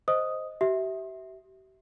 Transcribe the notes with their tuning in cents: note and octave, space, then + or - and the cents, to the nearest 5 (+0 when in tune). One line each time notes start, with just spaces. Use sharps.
C5 +0 D#5 +5 D#6 +0
G4 -40 E5 -15